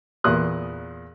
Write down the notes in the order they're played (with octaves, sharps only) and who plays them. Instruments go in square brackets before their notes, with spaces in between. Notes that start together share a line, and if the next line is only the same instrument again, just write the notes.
[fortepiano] E2 A#2 C6 D#6 F#6